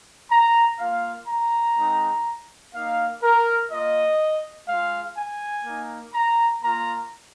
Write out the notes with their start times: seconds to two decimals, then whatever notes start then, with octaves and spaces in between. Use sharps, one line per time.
0.30 A#5
0.79 A#3 F4 F5
1.28 A#5
1.77 G#3 C4 D#4
2.74 A#3 D#4 F5
3.23 A#4
3.70 A#3 F4 D#5
4.68 G#3 F4 F5
5.16 G#5
5.65 A#3 D#4
6.14 A#5
6.62 A#3 F4 A#5